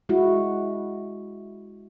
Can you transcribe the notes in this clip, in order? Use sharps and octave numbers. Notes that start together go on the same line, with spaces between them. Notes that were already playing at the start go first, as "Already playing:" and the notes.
G#3 E4 F#4